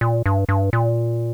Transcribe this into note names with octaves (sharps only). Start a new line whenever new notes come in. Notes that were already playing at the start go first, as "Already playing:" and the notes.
A#2
G2
G2
A#2